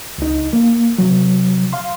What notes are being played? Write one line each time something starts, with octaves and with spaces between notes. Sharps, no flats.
C#2 D#4
A#3
C3 F#3
F5 C6